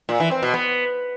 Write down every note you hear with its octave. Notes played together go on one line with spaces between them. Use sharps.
A#2
E3
C4
B2
B3